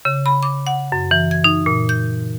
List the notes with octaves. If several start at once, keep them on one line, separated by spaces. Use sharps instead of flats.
C#3
B5
D6
F#5
F#2
E3
G#6
D#4
A#2
G6